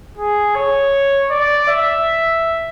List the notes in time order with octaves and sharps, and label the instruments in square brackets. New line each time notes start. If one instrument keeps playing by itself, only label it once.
[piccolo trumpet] G#4
C#5
D5
E5